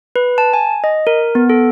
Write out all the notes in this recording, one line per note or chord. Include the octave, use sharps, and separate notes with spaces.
B4
A5
G#5
D#5
A#4
B3
A4